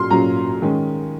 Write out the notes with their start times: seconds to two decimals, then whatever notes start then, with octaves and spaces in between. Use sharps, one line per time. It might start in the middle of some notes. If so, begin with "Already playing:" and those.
Already playing: A#2 F#3 C#4 C6 F6
0.10 A#2 F#3 C#4 A#5
0.62 D#3 G#3 C#4